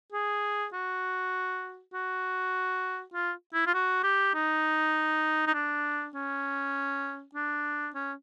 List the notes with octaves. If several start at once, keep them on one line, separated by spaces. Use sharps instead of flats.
G#4
F#4
F#4
F4
E4
F4
F#4
G4
D#4
D#4
D4
C#4
D4
C#4